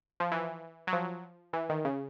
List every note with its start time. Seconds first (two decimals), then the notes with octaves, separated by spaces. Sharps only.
0.20 F3
0.32 E3
0.87 F#3
0.93 F3
1.53 E3
1.69 D#3
1.85 C#3